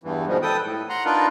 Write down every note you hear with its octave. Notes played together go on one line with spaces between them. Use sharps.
E2 G2 E3
G#2 B2 D#3 F3 G3 G#3
A4 B4 G5 D#6
A2
F#5 A#5 C6
D4 D#4 F4 A#4 B4